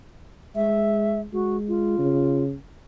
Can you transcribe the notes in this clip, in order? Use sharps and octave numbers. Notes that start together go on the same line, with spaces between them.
G#3 E5
G#3 F#4
F4
C#3